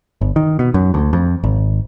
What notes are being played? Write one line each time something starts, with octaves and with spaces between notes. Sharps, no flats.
G1
D#3
B2
F#2
D2
F2
G#1